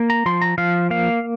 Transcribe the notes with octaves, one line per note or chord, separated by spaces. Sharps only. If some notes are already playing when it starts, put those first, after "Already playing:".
Already playing: A#3
A#5
F3 C6
A#5
F3 F5
A#3 F5